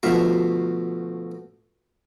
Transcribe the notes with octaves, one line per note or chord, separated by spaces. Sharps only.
D2 B2 F3 E5 F5